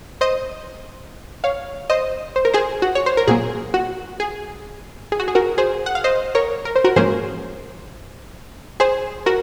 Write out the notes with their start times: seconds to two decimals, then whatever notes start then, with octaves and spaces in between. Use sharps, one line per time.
0.21 C5 D#5
1.44 C#5 F5
1.90 C5 D#5
2.36 C5
2.45 A#4
2.54 G#4 C5
2.82 F#4
2.95 C#5
3.06 C5
3.17 A#4
3.28 A#2 F#3 A#3 G#4
3.74 F#4
4.20 G#4
5.12 G#4
5.20 F#4
5.28 G#4
5.35 F#4 A#4
5.58 G#4 C5
5.86 F#5
5.95 F5
6.04 C5 D#5
6.35 A#4 C#5
6.65 A#4
6.76 C5
6.84 F#4 A#4
6.96 G#2 F3 A#3 C#4 G#4 C5
8.80 G#4 C5
9.26 F#4 A#4